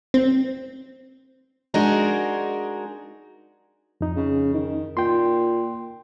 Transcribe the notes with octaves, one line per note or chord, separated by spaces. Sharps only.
C4
G#3 D4 D#4 F#4 G#4 A#4
F2 D#4
C#3
D#3
A#2 G5 C6